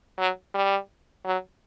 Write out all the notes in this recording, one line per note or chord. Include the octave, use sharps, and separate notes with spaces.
F#3
G3
F#3